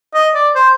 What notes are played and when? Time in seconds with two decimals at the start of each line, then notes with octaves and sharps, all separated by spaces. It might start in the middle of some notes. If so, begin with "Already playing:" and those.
0.14 D#5
0.35 D5
0.55 C5